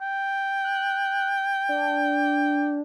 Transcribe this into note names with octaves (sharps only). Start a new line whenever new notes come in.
G5
F#6
D4